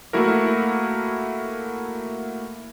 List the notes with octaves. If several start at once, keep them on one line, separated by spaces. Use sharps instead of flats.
A3 A#3 E4 F#4 A#4